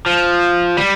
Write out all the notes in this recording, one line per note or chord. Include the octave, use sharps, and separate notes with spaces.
F3
G3